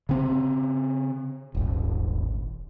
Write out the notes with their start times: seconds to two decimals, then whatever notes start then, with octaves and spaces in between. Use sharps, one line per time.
0.09 C#3 C4
1.55 D#1 G#1